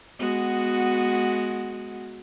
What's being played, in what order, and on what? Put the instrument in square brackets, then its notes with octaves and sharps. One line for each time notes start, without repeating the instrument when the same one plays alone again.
[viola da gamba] G#3 B3 F#4